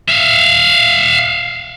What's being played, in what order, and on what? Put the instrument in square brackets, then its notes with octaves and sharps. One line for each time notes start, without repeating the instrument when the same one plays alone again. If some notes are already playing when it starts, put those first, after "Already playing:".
[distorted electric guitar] E5 F5